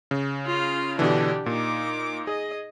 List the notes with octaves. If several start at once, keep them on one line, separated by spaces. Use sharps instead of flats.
C#3
F4 F5
B2 D3 E3 D4 G4
A#2 D#4 D6
G#4 D#5